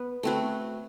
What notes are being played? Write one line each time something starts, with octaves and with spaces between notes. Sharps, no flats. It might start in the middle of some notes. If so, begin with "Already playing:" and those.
Already playing: B3 B4
A3 C4 F#4 B4